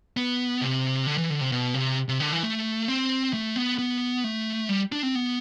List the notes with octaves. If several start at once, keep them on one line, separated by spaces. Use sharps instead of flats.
B3
C3
D3
E3
D3
C3
B2
C3
C3
D3
E3
A3
C4
A3
B3
B3
A3
G3
D4
C4
B3